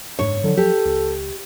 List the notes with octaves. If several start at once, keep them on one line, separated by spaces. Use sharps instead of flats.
F#1 G#2 D4 C#5
D3 F3 F#3
G4 A4
C#2